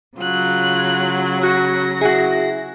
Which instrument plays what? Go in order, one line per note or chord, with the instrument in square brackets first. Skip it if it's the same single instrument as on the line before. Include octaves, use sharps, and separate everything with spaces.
[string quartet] C#3 F#3 [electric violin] F4 F#6
[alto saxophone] F#4 [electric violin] A#6
[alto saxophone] E4 [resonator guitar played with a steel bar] F#4 G#4